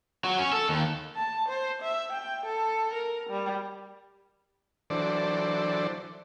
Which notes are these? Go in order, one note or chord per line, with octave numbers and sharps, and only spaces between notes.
F#3
C#4
A4
D#2
A5
C5
E5
G5
A4
A#4
G3
E3 F#3 D4 A4 C5 D5